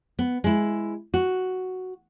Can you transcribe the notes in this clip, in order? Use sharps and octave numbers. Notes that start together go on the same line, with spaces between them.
B3
G#3 E4
F#4